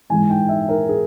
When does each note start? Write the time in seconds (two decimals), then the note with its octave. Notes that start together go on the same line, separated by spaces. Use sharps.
0.10 G#2 E3 G#3 G#5
0.30 G5
0.49 E5
0.69 A#4
0.89 G#4